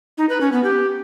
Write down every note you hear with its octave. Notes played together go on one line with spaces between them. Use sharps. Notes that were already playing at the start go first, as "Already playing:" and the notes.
D#4
B4
C#4
B3
G4